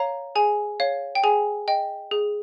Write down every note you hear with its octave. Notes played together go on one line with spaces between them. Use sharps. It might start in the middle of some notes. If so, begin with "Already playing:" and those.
Already playing: C#5 F5 A#5
G#4 G#5
C#5 F5
G5
G#4 G#5
D#5 G5
G#4